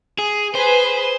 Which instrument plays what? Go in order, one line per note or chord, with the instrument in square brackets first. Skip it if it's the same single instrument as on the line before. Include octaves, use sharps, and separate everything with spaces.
[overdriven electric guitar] G#4
[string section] G#4 B4 [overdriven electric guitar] C5